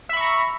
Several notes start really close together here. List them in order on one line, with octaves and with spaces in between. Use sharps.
E5 B5 C#6 A#5